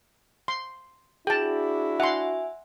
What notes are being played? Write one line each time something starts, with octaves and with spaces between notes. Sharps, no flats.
C6
D4 E4 F#4 G#4 G5 A5
E5 F#5 G#5 C6